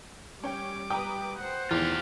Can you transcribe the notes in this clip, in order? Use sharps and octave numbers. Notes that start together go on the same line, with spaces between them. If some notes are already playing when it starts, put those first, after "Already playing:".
G3 C#4 G5 D6
B4 G5 A#5 D#6
C5 F#5
E2 D#3 F3 F4 G4